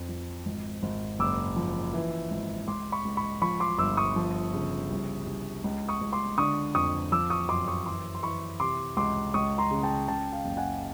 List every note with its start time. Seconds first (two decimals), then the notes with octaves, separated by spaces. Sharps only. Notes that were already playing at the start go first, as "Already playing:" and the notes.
Already playing: F2
0.09 F3
0.46 G#1
0.83 G#1
1.19 F#1 D6 E6
1.56 F3
1.93 E3
2.31 G#1
2.68 C#2 C6 D6
2.92 B5 C#6
3.05 C#2
3.17 B5 C#6
3.42 F3 B5 C#6
3.60 C6 D6
3.78 G1 D6 E6
3.97 C#6 D#6
4.16 F3
4.53 C#3
4.90 C2
5.26 C2
5.64 C#2
5.89 C#6 D#6
6.01 C#2
6.13 C6 D6
6.38 D3 C#6 D#6
6.75 F2 C#6 D#6
7.12 F3 D6 E6
7.30 C#6 D#6
7.49 F#2 C6 D6
7.68 C#6 D#6
7.86 E3 C6 D6
8.15 C6
8.23 E3 B5 C#6
8.60 C3 C6 D6
8.97 C#2 C6 D6
9.34 C#2 C#6 D#6
9.58 A#5 C6
9.71 C#3
9.83 G5 A5
10.08 C#3 G5 A5
10.32 F5 G5
10.45 F#1
10.57 F#5 G#5